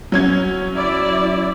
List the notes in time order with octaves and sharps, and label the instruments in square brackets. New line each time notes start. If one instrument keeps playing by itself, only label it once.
[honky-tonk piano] F#3 C#4 G#6
[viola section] E4 D5